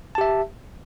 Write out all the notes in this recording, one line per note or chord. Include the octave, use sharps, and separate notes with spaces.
G4 E5 A5